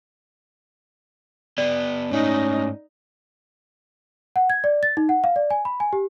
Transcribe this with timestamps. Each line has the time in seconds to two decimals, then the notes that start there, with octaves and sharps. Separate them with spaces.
1.58 B3 G4 D5
2.11 G#2 A3 C#4 D#4 D#5
4.36 F#5
4.50 G#6
4.64 D5
4.83 A6
4.97 D#4
5.09 F#5
5.24 F5
5.36 D5
5.50 G#5
5.65 B5
5.80 G#5
5.93 G4